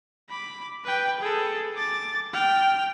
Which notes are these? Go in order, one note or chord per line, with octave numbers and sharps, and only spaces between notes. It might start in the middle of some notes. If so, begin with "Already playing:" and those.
B5 D6
B4 G5
G#4 A4
D6 A6
G5 F6